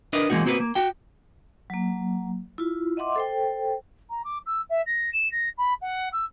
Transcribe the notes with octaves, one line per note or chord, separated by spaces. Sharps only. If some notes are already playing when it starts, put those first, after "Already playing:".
D4 A#4 B4 D#5
E3 G#3 A#3 D#4 F#4
A#3 C4 F#4 A4 B4
A#3
F#4 G5
F#3 A#3
E4 F4
D#5 E5 F#5 C6 D6
A4 C5 G5
A#5
D6
E6
E5
A#6
E7
A#6
B5
F#5
E6